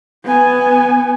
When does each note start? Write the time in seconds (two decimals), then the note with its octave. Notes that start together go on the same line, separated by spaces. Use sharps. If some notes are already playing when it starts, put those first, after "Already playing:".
0.24 B3 G#5